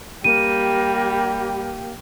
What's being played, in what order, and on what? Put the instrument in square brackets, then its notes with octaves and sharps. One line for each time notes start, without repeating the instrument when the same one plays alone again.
[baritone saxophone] G3 [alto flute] A#3 [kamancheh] G4 [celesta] D#7